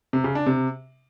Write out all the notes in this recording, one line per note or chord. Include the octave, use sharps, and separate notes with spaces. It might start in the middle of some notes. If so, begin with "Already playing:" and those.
C3
C#3
D4
C3